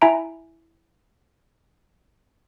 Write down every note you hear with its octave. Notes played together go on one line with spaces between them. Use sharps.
E4 E5 G#5 A#5 D7